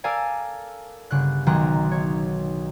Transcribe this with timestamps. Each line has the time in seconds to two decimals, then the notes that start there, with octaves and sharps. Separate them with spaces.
0.04 A4 A#4 D5 F5 G#5 A#5
1.11 G1 C#3 F#6
1.46 B1 D#3 G#3 A#5 F#6
1.91 C#5